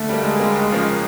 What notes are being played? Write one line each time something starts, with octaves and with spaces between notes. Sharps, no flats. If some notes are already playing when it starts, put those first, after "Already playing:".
Already playing: D3 A3
G3 A#3
D3 G#3
G3 A#3
D#2
C#3 F3 A#3